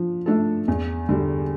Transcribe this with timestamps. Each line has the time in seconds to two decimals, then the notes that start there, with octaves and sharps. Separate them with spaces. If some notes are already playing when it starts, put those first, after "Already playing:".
Already playing: F3 D4
0.26 A3 D4 A4
0.68 E2
1.09 D3 G3